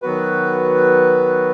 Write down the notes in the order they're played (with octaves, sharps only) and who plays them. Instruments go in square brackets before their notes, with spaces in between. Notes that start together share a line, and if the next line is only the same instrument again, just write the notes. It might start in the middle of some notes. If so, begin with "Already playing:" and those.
[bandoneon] D#3 F#3 B3 F#4 B4